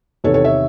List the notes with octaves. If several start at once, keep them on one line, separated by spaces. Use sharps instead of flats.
E2 C3 D#3 A4 C#5
A4 C#5
C#5 E5